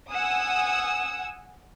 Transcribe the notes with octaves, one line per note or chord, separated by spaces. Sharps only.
F#5 G#5 D#6 E6